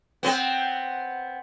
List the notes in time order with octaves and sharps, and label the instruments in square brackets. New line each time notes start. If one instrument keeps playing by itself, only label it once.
[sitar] B3 C4